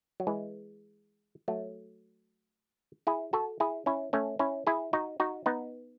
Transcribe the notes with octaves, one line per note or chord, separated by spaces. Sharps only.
F#3
E3 G#3
F#3 A3
E4 G#4
F#4 A4
E4 G#4
C#4 E4
A3 C#4
C#4 E4
E4 G#4
D#4 F#4
D#4 F#4
B3 D#4